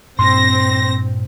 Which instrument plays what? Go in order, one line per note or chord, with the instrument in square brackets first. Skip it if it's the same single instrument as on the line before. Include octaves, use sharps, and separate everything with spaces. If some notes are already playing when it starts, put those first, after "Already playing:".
[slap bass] G2 A#2 [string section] C4 A#6 [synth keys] C6